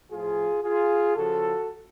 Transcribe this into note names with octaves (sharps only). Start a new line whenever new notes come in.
A2 F3 F4 G#4
F4 G#4
C#3 F3 F#4 A4